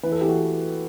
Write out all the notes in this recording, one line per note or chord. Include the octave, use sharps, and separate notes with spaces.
E3 B4
A4
E3 G4
F#4 A4